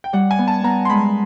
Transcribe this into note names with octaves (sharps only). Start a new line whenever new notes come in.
G5
G3 F#5
G#5
B3
A5
B3 A#5
C6
G#3 B5